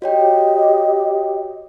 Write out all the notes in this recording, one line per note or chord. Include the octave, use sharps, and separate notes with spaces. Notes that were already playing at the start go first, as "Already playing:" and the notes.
F#4 G4 C#5 D#5 G5